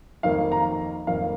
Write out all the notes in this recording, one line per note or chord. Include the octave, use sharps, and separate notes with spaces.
F2 D#3 A#3 F5
A#5
F2 D#3 A#3 F5